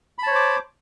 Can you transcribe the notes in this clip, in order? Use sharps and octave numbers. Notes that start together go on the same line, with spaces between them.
C5 C#5 A5 B5 D6